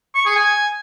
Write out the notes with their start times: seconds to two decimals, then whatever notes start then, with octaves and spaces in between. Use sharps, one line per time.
0.15 C#6
0.25 G#4
0.35 G#5